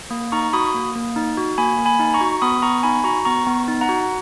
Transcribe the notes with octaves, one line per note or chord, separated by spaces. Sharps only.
A#3
D#4 A#5 C#6
F#4 B5 D#6
A#3
A#3
D#4
F#4
A#3 G#5 B5
A#3
G#5 B5
D#4
A#5 C#6
F#4
B3 B5 D#6
B3 A#5 C#6
D#4 G#5 B5
F#4 A#5 C#6
B3 A#5 C#6
B3
D#4
F#5 A#5
F#4